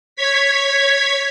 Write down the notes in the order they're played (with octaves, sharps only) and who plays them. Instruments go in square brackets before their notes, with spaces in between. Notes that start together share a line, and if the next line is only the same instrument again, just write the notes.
[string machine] C#5 G#6 B6